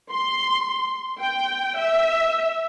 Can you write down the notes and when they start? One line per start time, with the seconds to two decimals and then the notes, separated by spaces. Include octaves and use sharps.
0.11 C6
1.20 G5
1.77 E5